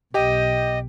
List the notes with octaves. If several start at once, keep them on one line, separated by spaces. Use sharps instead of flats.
B1 G4 D#5 G5